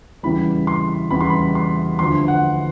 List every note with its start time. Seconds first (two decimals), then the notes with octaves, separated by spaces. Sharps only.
0.23 E2 C#3 E3 G3 B5
0.67 C6
1.11 E2 C#3 E3 G3 B5
1.21 C6
1.30 B5
1.55 C6
1.99 D2 D3 F3 C6
2.28 F#5